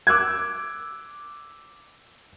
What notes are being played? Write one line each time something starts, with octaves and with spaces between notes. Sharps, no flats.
D6 E6 F#6 G#6